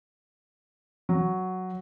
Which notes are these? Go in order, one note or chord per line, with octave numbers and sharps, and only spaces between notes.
F#3